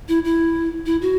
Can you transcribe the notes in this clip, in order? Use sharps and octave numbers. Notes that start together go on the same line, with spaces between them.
E4
E4
E4
F#4